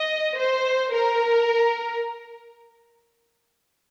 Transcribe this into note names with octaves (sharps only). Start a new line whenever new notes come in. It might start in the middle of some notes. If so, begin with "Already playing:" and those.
Already playing: D#5
C5
A#4